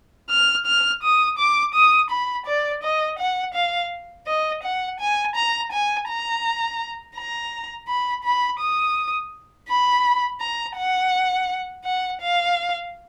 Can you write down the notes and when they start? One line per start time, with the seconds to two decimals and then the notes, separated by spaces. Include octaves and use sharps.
0.30 F6
0.66 F6
1.03 D#6
1.39 D6
1.74 D#6
2.10 B5
2.46 D5
2.83 D#5
3.19 F#5
3.55 F5
4.27 D#5
4.63 F#5
5.00 G#5
5.36 A#5
5.72 G#5
6.08 A#5
7.17 A#5
7.88 B5
8.24 B5
8.60 D#6
9.69 B5
10.41 A#5
10.77 F#5
11.85 F#5
12.22 F5